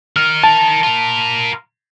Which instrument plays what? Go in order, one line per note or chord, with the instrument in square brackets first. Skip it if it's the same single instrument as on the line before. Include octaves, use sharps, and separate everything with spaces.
[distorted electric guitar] D#4 A#4 [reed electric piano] F6
[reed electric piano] A5
[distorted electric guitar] F4 A#4